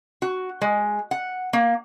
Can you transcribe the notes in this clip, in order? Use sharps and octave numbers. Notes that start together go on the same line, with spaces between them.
F#4
G#3
F#5
A#3